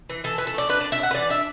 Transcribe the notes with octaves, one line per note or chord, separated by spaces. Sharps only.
E3
E3 A4
E3 B4
A4
A3 D5
D4 B4
D4 D5
E5
D4
F#5
B4
E3 D5
D4 E5